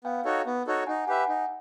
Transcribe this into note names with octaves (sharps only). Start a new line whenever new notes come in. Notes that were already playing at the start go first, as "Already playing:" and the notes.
B3 F5 G5
D#4 F#4 A4 C#5
B3
D#4 F#4 A4 C#5
D#4 F#5 G#5
G4 B4 E5 F#5 G#5
D#4